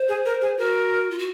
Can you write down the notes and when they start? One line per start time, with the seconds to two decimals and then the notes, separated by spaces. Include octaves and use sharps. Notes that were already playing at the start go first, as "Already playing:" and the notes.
Already playing: C5
0.09 G#4
0.26 A#4
0.41 G#4
0.58 F#4 A#4
1.11 F4
1.19 F#4